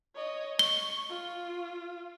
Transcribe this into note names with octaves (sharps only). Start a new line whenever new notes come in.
C#5 D#5
C#6 G7
F4